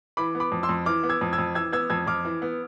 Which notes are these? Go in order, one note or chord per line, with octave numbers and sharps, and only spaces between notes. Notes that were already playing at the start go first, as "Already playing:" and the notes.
E3 B5 D6
B3
B5 D6
F2
C6 E6
F2
E3 D6 F6
B3
E6 G#6
F2
E6 G#6
F2
E3 E6 G#6
B3 E6 G#6
F2 E6 G#6
F2 D6 F6
E3
B3